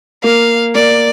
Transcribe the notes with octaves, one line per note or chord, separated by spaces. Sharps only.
A#3 F5
A#3 D5